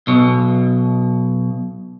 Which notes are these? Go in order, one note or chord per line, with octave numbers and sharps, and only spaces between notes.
B1 B2